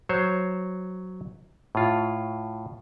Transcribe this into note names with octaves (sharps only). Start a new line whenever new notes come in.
F#3 C5 C#5
A2 F4